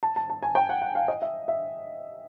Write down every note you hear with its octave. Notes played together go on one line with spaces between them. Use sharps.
A5
A5
A5
G#5
G5
F#5
F#5
F5
D#5
E5
E5